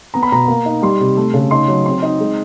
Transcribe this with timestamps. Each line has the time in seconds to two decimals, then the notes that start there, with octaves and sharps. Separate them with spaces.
0.14 B3 A#5
0.23 B5
0.32 B2 A#5
0.48 A#3
0.66 D#4
0.82 G3 C6
1.00 C3
1.17 A3
1.34 C#3
1.51 D#4 C6
1.68 F#3
1.85 C4 C6
2.03 D#4
2.20 G#3